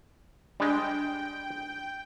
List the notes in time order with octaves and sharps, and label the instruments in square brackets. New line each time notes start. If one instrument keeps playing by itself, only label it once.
[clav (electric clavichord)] G3 G#3 [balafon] D4 [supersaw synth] G5